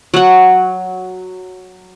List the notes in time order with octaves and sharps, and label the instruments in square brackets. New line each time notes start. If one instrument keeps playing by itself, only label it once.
[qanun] F#3 F#5